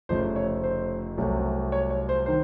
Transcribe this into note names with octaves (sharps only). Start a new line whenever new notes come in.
F1 F2 C#3 F3 A3 C5
C#5
C5
C2 C3 F#3 A3
C#5
C#5
C5
D#3 C5